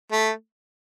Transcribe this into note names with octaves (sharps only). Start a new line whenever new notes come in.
A3